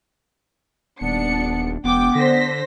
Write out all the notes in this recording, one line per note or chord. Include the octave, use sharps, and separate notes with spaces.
D#1 B3 D4 C#7
E1 B3 G5 D6
D3 C5 A#6 B6